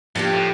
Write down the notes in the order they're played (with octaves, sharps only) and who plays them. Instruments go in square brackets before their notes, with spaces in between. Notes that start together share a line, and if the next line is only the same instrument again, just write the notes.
[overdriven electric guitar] G2 [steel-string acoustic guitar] F3 A#3 D4 G4
[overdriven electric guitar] A2